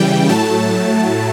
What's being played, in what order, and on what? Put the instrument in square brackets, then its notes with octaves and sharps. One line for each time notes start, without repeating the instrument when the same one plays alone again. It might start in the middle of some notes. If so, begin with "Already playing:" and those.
Already playing: [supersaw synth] C#3 E3 G3 G5
A2 F#3 A3 A5